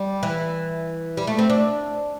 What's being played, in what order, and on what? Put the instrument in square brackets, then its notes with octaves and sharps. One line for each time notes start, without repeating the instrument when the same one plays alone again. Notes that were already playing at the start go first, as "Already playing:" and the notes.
Already playing: [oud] G3
E3
G3
A3
C4
D4